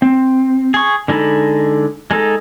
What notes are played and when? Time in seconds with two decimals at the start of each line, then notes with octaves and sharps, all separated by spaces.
0.02 C4
0.74 G#4 C#6
1.08 D3 G#3 D#4 A4 B5
2.11 G#3 D#4 A4